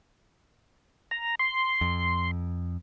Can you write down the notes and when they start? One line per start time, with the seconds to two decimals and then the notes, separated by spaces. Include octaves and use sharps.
1.11 A#5
1.39 C6
1.81 F2